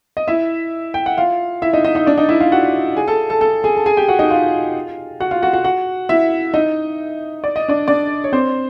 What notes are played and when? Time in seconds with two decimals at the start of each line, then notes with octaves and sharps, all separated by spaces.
0.17 D#5
0.28 E4 E5
0.94 G5
1.06 F#5
1.18 F4 F5
1.62 E4 E5
1.73 D#4 D#5
1.84 D#4 D#5
1.95 D#4 D#5
2.06 D4 D5
2.18 D#4 D#5
2.29 E4 E5
2.40 F4 F5
2.52 F#4 F#5
2.96 G#4 G#5
3.08 A4 A5
3.30 A4 A5
3.41 A4 A5
3.64 G#4 G#5
3.76 A5
3.86 G#4 G#5
3.97 G4 G5
4.09 F#4 F#5
4.19 D#4 D#5
4.30 F4 F5
5.20 F#4 F#5
5.31 F4 F5
5.42 F#4 F#5
5.53 F#4 F#5
5.64 F#4 F#5
6.09 E4 E5
6.54 D#4 D#5
7.44 D5
7.56 D#5
7.68 D4 D5
7.88 D4 D5
8.24 C#5
8.33 C4 C5